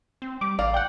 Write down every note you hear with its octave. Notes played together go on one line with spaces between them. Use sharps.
C4
G3 D6
A1 D5 F5 A#5
F#5 G5